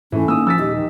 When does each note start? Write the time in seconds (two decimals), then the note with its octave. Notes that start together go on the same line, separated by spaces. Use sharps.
0.12 G#2 E3 A3 C#4 E4
0.28 D#3 A#3 D#6 E6
0.47 F3 E6 A6 B6
0.59 D#1 D#4 G4
0.75 D#3